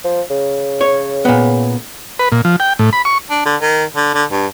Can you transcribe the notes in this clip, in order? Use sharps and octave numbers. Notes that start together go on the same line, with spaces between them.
F3
C#3
C#5
A#2 B3
B4
A#2
F3
G5
A2
B5
C#6
D4
D3
D#3
D3
D3
G2